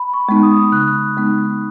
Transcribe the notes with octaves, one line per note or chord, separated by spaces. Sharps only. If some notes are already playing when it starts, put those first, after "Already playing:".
Already playing: B5
C#6
G#3 B3 D#4
D#6
C#3 F#6
G#3 B3 D#4